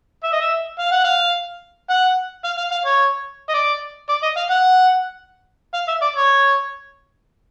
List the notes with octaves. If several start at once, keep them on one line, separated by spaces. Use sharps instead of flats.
E5
D#5
E5
F5
F#5
F5
F#5
F5
F5
F5
C#5
D#5
D5
D5
D#5
F5
F#5
F5
E5
D5
C#5